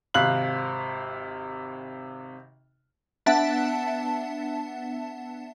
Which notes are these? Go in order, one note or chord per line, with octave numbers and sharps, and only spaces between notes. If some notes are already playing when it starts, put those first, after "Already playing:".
G#1 C3 F5 F#6 F#7
B3 D4 E5 F#5 A5